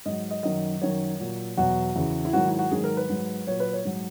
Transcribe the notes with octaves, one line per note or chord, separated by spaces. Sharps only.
G#2 F#3 D#5
D#5
F#2 D#3 F#3 D#5
F#2 D#3 F#3 C#5
A#2 F#3
E2 B2 F#3 F#4
E2 C#3 E3
E4
G#2 D#3 F#3 F#4
E4
F#4
G#2 D#3 F#3 G#4
A#4
B4
G#2 F#3
A#2 F#3 C#5
B4
C#5
G#2 F#3